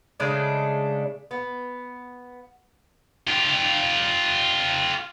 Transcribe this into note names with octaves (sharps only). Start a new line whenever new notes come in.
C#3 G#3 A3 D4
B3
F4 G4